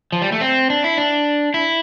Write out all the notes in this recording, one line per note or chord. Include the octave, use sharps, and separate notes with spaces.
F3
G3
A3
C4
D4
E4
D4
E4